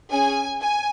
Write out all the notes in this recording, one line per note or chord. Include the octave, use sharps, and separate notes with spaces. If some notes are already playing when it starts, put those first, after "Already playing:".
C#4 G#4 G#5
G#5